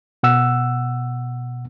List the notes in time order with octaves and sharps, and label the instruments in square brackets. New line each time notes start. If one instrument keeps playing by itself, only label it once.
[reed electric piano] B2 F#5 E6